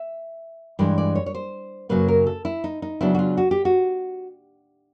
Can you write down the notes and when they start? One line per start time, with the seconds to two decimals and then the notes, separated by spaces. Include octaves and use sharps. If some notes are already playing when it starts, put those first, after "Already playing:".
Already playing: E5
0.79 G2 E3 G#3 D5
0.98 D5
1.15 C#5
1.26 C#5
1.34 C5
1.89 F#2 C#3 F#3 A#3 B4
2.08 A#4
2.27 A4
2.45 E4
2.64 D#4
2.82 D#4
3.01 C#3 F#3 B3 D4 E4
3.15 F#4
3.19 F4
3.37 F#4
3.51 G4
3.65 F#4